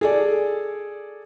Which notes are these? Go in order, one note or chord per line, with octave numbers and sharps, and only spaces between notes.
G#4 A4 D5